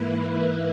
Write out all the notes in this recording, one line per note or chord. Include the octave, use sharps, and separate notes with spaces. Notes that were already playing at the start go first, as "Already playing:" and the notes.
Already playing: G#2 E3 A#3 E4 B4